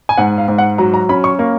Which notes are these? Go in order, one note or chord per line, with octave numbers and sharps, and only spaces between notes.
G#5
G#2 F#5
F5
G#2
F#5
F#3 A#5
A#5
C#4 B5
C#6
A#3